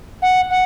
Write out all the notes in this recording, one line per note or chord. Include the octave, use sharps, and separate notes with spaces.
F#5
F#5